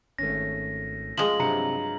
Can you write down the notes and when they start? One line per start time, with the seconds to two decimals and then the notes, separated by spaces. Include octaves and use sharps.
0.18 G#1 A3 C#4 A#6
1.18 F3 G#3 F#7
1.40 G2 C3 F#3 A#5 C#7